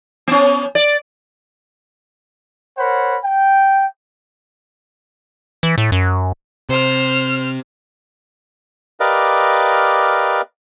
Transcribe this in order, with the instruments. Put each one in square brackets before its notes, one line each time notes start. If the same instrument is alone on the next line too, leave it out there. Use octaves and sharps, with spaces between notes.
[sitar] B3 C#4
D5
[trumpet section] A#4 C5 C#5 F#5 B5
G5
[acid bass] E3
A2
F#2
[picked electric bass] C3 [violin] C5 F6
[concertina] G4 A#4 B4 D5 D#5 F5